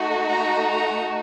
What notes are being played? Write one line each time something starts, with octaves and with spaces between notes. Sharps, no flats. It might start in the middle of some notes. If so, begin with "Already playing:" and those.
Already playing: A3 D#4 F#4
A#5
A#5